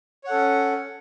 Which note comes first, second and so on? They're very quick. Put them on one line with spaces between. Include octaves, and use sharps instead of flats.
C#5 F#5 A4 C#4